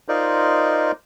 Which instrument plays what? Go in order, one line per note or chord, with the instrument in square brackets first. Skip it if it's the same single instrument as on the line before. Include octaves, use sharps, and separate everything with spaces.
[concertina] D#4 F4 A#4 C5 D5 D#5